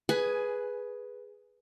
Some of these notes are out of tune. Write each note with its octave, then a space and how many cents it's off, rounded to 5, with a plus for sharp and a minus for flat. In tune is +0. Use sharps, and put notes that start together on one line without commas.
G#4 +0 B4 +0 G#5 +15